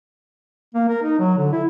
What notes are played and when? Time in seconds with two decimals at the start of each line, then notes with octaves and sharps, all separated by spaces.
0.74 A#3
0.89 A#4
1.02 D#4
1.19 F#3
1.37 D3
1.52 E4